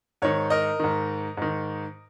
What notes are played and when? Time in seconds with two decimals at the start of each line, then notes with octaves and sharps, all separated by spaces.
0.22 G#2 D#3 C#5
0.50 A#4 D#5
0.80 G#2 D#3
1.37 G#2 D#3